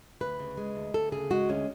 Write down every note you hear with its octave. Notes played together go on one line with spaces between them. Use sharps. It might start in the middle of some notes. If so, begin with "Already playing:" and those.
D2 B4
C#3
G#3
D2
D2 A4
C#3 G#4
G#3 F#4
D2 C#4